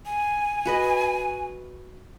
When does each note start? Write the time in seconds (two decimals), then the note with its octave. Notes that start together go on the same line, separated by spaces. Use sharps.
0.06 G#5
0.65 F#4 B4 D#5